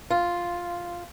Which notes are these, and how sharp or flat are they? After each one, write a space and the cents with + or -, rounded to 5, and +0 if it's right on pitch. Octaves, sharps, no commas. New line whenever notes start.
F4 +0